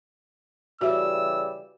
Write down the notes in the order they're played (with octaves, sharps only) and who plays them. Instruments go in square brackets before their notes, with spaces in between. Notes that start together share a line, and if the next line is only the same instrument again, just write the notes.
[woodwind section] C#3 E3 G3 [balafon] F#4 E5 [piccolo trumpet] E6